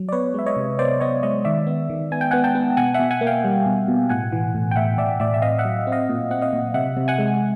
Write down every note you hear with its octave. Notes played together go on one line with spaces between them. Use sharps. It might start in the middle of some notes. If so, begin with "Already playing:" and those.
Already playing: F#3
D5
B3 B4 C#5
G#3 E5
C#5 D#5
C3
B3 C5 D5
B3 C#5 D#5
G#3 C#5 D#5
D#3 D5 E5
B3
D#3
B3 G#5
G5
B3 F#5 G#5
G5 A5
B3
B2 F#5 G#5
B2 E5 F#5
F#5 G#5
A#3
F5 G5
G3
B2
B2
A2 F#5 G#5
E3
A2
G5
A2 E5 F#5
A2 D5 E5
A2 D5 E5
E5
C4 D#5 F5
E5 F#5
F#3
C4
D#5 F5
A#2
C4 F#5
D#5 F5
A#2
C3 E5 F#5
C3
F#5 G#5
G#3